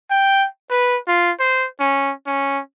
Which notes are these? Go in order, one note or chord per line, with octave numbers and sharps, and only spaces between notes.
G5
B4
F4
C5
C#4
C#4